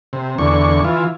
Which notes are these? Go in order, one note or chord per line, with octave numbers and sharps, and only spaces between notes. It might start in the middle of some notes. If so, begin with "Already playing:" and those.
C3
E2 D3 C#6
E3 F4